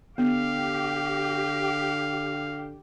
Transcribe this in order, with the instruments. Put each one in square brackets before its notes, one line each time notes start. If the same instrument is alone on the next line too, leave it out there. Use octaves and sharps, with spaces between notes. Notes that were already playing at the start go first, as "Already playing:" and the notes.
[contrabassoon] D3 [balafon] B3 [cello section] G4 [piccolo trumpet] F5